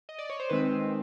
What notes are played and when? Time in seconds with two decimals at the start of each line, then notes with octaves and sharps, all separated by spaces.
0.09 D#5
0.19 D5
0.30 C#5
0.40 C5
0.49 D#3 G#3 C4 B4